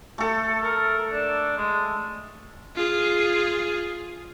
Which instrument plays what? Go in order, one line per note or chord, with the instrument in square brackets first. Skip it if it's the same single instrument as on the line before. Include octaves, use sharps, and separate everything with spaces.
[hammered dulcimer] A3 A4
[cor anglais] A#4
D4
G#3
[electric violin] F4 G#4